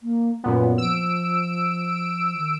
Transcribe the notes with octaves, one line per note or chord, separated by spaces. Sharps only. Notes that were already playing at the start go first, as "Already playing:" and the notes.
A#3
F#2 A#2 B3 F4
F3 E6 D7
D#3